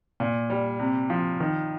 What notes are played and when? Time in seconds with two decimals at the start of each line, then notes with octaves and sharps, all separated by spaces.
0.20 A#2
0.50 G3
0.79 C3
1.10 F3
1.40 D#3